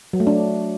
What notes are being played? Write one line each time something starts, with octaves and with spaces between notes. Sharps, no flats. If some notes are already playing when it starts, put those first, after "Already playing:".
F#3
A3
D4